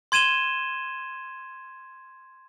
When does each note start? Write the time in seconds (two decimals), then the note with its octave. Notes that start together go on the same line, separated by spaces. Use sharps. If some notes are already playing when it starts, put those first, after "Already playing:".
0.12 C6 G#6 D#7 E7 G7